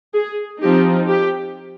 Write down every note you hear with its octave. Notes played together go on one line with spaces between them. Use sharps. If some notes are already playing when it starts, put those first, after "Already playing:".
G#4
F3 C4 D#4 G4
G4